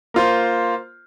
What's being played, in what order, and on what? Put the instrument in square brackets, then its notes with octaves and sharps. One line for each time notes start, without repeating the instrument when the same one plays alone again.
[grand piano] A#3 F4 C5